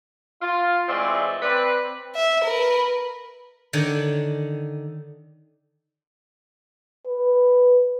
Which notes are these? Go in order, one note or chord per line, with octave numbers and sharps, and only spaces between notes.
F4
E3 G#3 A3 C4 F4 D5
C4 B4 D5
E5
A#4 B4
D3 D#3 D4 C#5 G5
B4